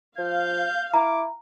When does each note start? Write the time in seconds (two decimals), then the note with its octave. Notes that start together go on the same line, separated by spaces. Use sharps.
0.18 F3 F5 G6
0.94 E4 A#5 D6